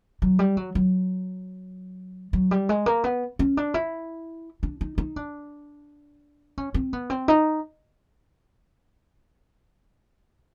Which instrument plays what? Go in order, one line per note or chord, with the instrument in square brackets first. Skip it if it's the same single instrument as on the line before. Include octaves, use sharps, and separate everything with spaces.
[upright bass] F#3
G3
F#3
F#3
F#3
G3
G#3
A#3
B3
C#4
D4
E4
D4
D#4
D#4
D4
C#4
C4
B3
C4
D#4